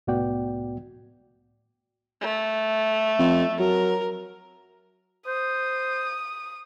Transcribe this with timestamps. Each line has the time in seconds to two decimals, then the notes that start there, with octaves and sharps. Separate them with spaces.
0.07 C2 A2 B3 F#4 D5 G5
2.21 A3
3.19 F2
3.60 F#3 A#4
5.27 C5 D#6